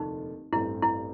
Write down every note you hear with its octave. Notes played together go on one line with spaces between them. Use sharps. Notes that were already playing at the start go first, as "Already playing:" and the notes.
Already playing: F1 D#2 D3 F3 A3 D#4
A1 G2 E3 A3 C4 E4
E4